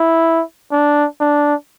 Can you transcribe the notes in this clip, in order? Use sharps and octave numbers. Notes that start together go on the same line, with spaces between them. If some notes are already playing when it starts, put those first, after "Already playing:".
Already playing: E4
D4
D4